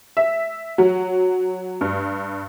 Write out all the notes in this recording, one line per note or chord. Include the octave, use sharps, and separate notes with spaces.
E5
F#3
G2